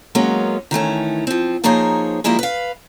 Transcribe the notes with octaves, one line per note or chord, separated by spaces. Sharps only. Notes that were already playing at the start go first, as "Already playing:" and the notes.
F#3 G#3 A#3 B3 C#4
D#3 E3 A3 C#4
F3 C4
F3 A#3 D#4 G#4 C5 C#5
F3 G3 G#3 A#3 E4 G#4
B4 F5